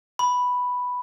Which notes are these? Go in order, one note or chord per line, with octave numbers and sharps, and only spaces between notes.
B5